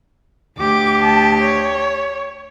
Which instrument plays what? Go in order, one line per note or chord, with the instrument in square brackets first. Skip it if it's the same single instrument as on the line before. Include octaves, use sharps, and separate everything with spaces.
[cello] D2 G4 [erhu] D6
[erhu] A5
C#5